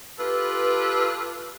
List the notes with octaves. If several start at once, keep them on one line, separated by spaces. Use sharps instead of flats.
F4 G4 A4 B4